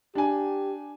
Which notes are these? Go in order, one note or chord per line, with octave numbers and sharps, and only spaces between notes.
D4 G4 G#5